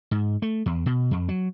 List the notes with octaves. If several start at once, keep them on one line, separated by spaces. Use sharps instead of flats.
G#2
A3
E2
B2
F2
F#3